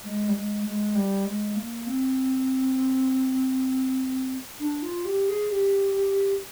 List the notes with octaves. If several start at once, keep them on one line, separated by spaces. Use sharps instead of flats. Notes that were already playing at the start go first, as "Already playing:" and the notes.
G#3
G3
G#3
G#3
G3
G#3
A#3
C4
D4
F4
G4
G#4
G4